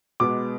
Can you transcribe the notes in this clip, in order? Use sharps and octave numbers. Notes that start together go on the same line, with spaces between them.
B2 G#3 B3 D6